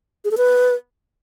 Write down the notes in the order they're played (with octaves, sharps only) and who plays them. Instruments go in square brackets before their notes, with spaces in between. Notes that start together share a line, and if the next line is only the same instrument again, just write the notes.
[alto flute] G#4
A4
B4